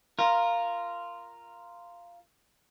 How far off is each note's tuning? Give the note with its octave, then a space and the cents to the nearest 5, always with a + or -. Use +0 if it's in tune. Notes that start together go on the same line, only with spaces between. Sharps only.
F4 -10 A#4 +0